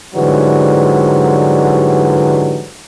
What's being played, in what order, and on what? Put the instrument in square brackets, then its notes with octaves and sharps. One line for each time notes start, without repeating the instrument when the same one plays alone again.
[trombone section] G#2 D3 E3 F#3 G3